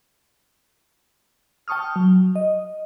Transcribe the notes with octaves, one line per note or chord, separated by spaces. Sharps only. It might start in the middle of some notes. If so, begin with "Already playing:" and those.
G5 A5 C#6 D#6 F6
F#3
D#5